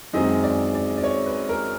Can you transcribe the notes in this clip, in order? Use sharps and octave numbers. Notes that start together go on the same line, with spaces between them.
F#2 D#3 G#3 C4 D#5
D5
D5
D5
C#5
B4
A#4